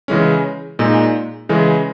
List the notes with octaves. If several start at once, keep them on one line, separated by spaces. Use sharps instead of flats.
C#3 E3 G#3 C#4
A#2 G#3 D#4
C#3 E3 G#3